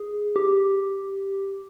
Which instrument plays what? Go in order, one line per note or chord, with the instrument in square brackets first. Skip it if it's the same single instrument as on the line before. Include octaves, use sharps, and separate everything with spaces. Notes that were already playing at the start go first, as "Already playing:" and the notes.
Already playing: [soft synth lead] G#4
G4